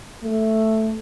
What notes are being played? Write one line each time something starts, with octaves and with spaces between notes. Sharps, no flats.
A3